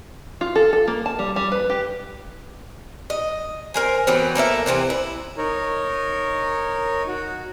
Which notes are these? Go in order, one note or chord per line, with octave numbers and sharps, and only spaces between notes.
F4
A4
A4
A#3
A5
G3
G3
B4
G4
D#5
A#4 C5 G#5
E3 F#3 B3 C4
A#3 A4 C#5 E5
C3 E3 A3 C4
E4
D#4 A#4 C#5
F#4